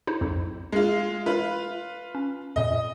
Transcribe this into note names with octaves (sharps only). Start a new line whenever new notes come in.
D#4 E4 C5
B1 F2
G#3 F4
F4 B4
C#4
F2 A#2 D#5